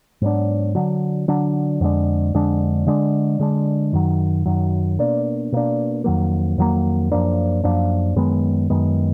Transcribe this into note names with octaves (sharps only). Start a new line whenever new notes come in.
G#2 F#3 B3 D4
D3 F#3 D4
D3 F#3 D4
F2 D3 G#3 D4
F2 D3 G#3 D4
D3 G#3 D4
D3 G#3 D4
F#2 D#3 F#3
F#2 D#3 F#3
B2 A#3 D4
B2 A#3 D4
F2 D#3 F#3 A#3
F2 D#3 F#3 A#3
F#2 F3 A#3 D4
F#2 F3 A#3 D4
F#2 D#3 G#3 B3
F#2 D#3 G#3 B3